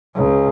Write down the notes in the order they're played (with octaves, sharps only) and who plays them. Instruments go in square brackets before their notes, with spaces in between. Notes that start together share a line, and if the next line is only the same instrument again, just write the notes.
[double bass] C#2